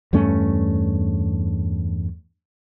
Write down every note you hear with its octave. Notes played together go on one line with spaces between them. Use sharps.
E2 G2 A3 C#4